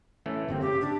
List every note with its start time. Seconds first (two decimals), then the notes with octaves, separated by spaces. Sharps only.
0.26 E3 A3 C#4
0.49 G1 C3 A#3 C4
0.61 C#3 G4
0.81 D4